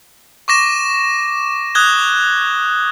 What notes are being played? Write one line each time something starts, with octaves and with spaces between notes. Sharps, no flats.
C#6 D6 A#6 E7
D#6 F#6 G#6 G7